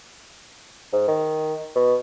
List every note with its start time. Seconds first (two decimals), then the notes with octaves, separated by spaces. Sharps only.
0.93 G#2
1.08 D#3
1.75 B2